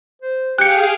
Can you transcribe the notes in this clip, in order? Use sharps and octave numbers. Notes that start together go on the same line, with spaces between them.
C5
G4 G#4 F5 G5 F#6 C#7